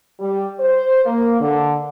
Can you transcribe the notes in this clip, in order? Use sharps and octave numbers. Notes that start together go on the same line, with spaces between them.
G3
C5
A#3
D3